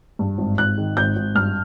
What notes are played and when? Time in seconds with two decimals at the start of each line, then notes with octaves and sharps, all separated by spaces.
0.19 G2
0.38 G#1
0.58 G#1 F#6
0.78 D#3
0.97 G#1 G6
1.16 G#1
1.35 G2 F6